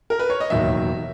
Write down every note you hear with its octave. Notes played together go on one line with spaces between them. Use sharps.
A#4
B4
C#5
D#5
E1 D#2 D#3 F#3 E5